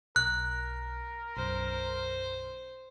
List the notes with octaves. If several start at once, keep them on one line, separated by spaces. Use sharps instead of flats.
B1 A#4 F#6
B1 F#2 C5